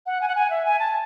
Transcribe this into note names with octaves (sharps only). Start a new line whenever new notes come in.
F#5
G#5
F#5
G#5
E5
G#5
A5